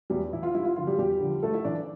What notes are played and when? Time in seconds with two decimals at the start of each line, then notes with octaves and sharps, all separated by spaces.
0.10 E2 G3 G4
0.33 E3 E4
0.43 F4
0.55 G2 E4
0.65 F4
0.76 D3 F3 F4
0.87 G3 G4
0.98 E2 G3 G4
1.20 D3 F3
1.43 G2 A3 A4
1.54 E4 E5
1.65 E3 D4 D5